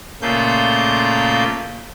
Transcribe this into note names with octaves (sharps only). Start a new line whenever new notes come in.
A#2 C#3 A3 A#3 F4 G6